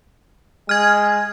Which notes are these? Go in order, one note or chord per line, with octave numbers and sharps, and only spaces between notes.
G#3 F6 G#6